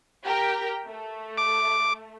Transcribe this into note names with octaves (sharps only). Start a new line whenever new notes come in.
G4 A#4 G5
A3
D6